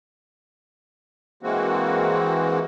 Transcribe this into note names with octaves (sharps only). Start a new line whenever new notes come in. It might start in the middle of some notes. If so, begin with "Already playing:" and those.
E3 G#3 A#3 C4 F#4